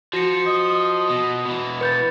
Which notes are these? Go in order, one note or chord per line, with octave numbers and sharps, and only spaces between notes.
F3 F#4 A#6 C#7
D#5
B2
B2 E3
B4 G6 A6